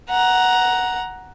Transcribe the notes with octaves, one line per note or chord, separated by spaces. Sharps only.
F#5 A#5